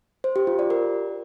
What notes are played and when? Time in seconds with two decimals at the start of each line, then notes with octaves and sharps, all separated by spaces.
0.24 C5
0.36 G4
0.47 F4
0.59 D5
0.70 A#4